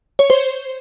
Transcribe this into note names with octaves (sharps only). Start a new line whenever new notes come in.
C#5
C5